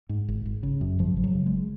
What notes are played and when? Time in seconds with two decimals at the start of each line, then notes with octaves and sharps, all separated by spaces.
0.09 G#2
0.28 G#1
0.46 G#1
0.63 C#3
0.81 F#2
0.99 G#1 F3
1.17 G#1
1.24 F#3
1.35 C#3
1.46 G#3